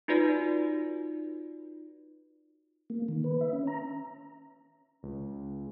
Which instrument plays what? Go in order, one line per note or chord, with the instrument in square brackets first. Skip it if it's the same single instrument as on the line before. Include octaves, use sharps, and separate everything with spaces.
[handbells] D#4 F4 F#4 B4 D5
[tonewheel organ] A#3
D#3
B4
E5
C#4
A#5
[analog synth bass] C#2